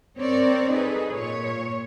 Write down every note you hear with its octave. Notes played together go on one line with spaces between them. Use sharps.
C4 A#4 C#5 D5
D#4 G#4 A4 B4
A#2 C#5